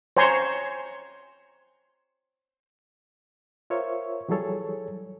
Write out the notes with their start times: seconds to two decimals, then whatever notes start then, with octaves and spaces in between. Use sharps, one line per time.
0.17 C5 C#5 G#5 A#5 C6 C#6
3.70 F4 A#4 C5 C#5 E5 C#6
4.29 E3 F#3 G3 G#4 A4 C#5